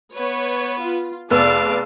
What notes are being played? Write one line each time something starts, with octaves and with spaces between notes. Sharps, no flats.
B3 B4 C#5
F4
F1 B3 G#4 D5 F5 A5 E6